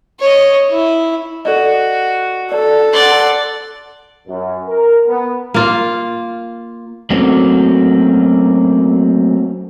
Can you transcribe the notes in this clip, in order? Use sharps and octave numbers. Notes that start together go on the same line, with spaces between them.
C#5 D#5
E4
F#4 A4 D5 D#5
A4 D5
D5 F#5 C6 F#7
F#2
A#4
B3
A#3 F4
F#3 A3 A#3 C4 C#4 F#4